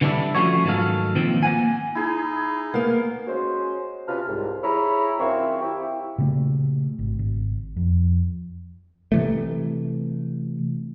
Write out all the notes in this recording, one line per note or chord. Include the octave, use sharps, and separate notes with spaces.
D3 E3 G3 C4 D4 E4
F3 A3 C#4 F#4 C#5
G#2 D#3 F#3 B3 A4 F5
A#2 D#3 F3 C4
A#3 F#5 G#5
D#4 E4 G#4
A#3 B3 F5
G#3 C#4 F#4 C5
C3 C#4 F4 B4 A5 F6
C2 G#2
E4 G#4 C#5 A#5 B5
F#2 D#3 C4 E4 F5 C#6
E4 G4
A#2 C#3 A3
G#1
G#1
F2
C3 E3 A3